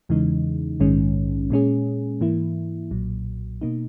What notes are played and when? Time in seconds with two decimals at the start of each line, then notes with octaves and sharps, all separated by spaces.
0.09 E2 C#3 E3 G#3 D#4
0.80 A#1 G#2 D#3 G#3 C#4
1.50 A#2 G#3 C#4 G#4
2.20 G#2 E3 A#3 E4
2.91 B1 A#2 F#3
3.61 B2 A#3 D#4